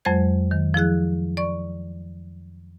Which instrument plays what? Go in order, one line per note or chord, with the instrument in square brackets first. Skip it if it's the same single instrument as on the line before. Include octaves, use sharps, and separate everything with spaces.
[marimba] F2 F#3 G#3 C5 G#6
D#3
F3 E4 G#4 F#6
D5 C#6